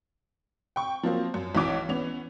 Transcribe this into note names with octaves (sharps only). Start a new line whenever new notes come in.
G5 C#6
F3 F#3 A#3 C4
F#2
B1 E3 D6
E3 B3 C#4 F7